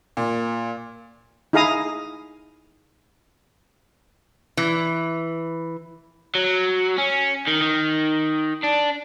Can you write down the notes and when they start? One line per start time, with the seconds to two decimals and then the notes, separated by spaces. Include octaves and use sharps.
0.17 A#2
1.53 D#4 E4 G#4 F5 A#5 D#6
4.57 E3
6.35 F#3
6.98 C#4
7.48 D#3
7.62 D#3
8.64 D4